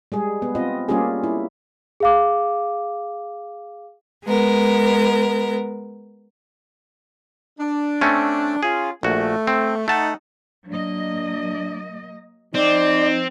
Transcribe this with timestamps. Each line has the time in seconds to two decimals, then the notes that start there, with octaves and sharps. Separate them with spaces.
0.12 G3 G#3 G#4
0.42 B3
0.55 C4 F4 D#5
0.89 G3 A#3 C#4 F4 G4 G#4
1.24 E4
2.00 G#4 F5 D6
4.25 G#3 B3 A#4
7.58 D4
8.01 A3 C4 C#4
8.63 C#4 F4 G#4
9.03 A#1 A3 F#4
9.47 C4
9.88 A3 D#4 F#5 A5
10.68 F#3 A#3 D4 D#5
12.55 F3 C4 D#4 D5